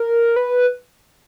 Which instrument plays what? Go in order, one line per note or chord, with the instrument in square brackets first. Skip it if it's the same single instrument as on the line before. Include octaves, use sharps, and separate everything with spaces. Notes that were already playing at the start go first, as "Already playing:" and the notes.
Already playing: [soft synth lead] A#4
B4